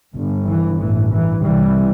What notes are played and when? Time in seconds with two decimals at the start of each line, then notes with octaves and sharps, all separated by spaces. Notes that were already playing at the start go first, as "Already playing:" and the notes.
0.15 G1 G2
0.47 E3
0.79 A1 G2 E3
1.11 E3
1.43 C2 C3 E3 G3